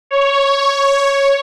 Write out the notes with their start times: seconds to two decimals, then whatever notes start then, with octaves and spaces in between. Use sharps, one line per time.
0.11 C#5